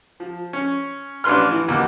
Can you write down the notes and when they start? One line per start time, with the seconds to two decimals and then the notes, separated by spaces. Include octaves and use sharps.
0.20 F3
0.53 C#4
1.24 A1 D4 B4 C6 F6
1.51 E3
1.68 D#2 B2